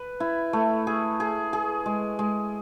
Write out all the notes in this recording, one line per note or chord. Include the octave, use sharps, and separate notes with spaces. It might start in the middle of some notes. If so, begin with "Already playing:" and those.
Already playing: B4
E4
A3
G#4
G#4
G#4
G#3
G#3